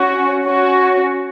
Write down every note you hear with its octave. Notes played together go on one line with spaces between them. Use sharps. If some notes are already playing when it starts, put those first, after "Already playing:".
Already playing: C#4 F#4
C#4 F#4